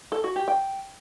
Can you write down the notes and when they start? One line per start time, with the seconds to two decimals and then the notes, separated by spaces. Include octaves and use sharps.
0.12 A4
0.24 F#4
0.36 G4
0.48 G5